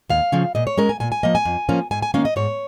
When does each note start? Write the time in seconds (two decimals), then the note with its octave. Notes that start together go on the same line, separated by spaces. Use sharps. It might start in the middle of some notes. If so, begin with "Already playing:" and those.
0.09 D#2 F5
0.32 C#3 F3 C#4
0.55 A#2 D#5
0.67 C#5
0.77 G#3 C#4 A#4
0.89 G#5
1.00 A#2 G#5
1.12 G#5
1.23 F3 A#3 D#5
1.35 G#5
1.45 F2
1.69 F3 A#3 C#4
1.91 G#2 G#5
2.02 G#5
2.14 D#3 A#3 C#4 F5
2.25 D#5
2.36 G#2 C#5